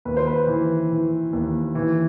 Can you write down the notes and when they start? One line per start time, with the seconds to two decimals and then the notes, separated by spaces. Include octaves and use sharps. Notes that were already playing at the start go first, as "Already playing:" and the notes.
0.05 D#2 B4
0.17 C5
0.27 B4
0.47 E3
0.89 E3
1.33 D#2
1.75 E3